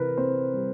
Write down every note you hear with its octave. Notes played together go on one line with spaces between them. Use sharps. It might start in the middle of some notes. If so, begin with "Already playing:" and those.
Already playing: C3 E3 A#4 B4
C4 C5
G3